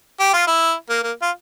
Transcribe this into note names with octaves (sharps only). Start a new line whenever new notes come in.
G4
F4
E4
A#3
A#3
F4